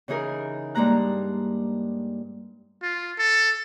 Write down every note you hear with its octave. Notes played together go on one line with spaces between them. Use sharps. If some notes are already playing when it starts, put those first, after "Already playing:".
C#3 E3 D#4 G#4 A#4
G2 G3 G#3 A#3 A#5 F#6
F4
A4